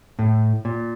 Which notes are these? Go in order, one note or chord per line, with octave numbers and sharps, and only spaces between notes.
A2
A#2